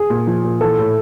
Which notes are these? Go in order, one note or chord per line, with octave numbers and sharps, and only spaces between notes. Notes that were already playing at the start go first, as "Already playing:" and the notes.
Already playing: G#4
A#2
F3
A#2
E3 A4
A2